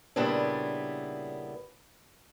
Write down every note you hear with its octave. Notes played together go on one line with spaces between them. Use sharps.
A#2 C#3 G3 B3 D4 E4